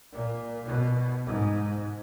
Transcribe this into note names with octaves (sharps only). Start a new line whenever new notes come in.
A#2
B2
G#2